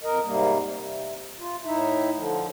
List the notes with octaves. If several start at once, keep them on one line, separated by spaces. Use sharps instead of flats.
F2 A#4 D#5
G#2 C3 G3 A#3
C3
F4
A2 D#4 E4 E5
D3 F3